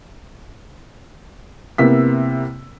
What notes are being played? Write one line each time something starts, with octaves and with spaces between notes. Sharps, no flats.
C3 A#3 B3 E4 E6 B6